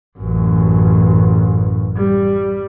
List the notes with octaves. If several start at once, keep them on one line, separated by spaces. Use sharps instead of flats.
A1 F#2
G3